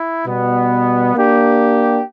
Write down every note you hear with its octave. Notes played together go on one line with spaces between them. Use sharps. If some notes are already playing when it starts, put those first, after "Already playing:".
Already playing: E4
B2 G3 B3
A#3 D4 G4